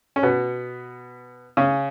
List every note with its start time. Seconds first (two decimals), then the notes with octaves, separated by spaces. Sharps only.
0.16 C#4
0.23 B2 B3
1.57 C#3 C#4